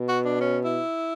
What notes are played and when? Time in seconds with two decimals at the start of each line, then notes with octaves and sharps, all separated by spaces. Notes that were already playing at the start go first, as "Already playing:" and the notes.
Already playing: B2
0.08 F#4
0.25 D4
0.41 C#4
0.65 E4